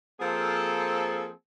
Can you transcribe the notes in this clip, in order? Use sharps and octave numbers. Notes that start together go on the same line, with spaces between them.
F3 A#3 C4 G#4 A4